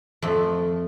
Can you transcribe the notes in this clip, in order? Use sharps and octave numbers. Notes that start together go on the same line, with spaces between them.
F2 A3